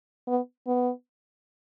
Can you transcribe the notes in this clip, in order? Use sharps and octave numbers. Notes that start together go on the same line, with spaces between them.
B3
B3